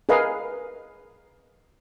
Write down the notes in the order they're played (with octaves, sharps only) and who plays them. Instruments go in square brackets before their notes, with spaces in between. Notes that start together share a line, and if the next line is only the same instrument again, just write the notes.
[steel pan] G#4 A#4 B4 D#5 F5